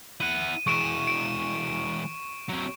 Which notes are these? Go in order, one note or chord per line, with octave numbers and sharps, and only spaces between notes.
E4 F#5 D#7
E3 G#3 C#6 D7 E7
D7
F#3 C4